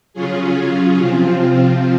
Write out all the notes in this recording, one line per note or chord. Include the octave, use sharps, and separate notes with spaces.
C#3 F#3 C#4 F4 G#4
C3 F3 C4 F4